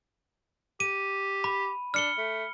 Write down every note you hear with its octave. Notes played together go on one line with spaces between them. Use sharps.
G4 D#7
B5
D4 F6 C#7 G7
A3